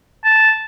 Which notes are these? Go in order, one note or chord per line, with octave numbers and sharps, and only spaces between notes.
A5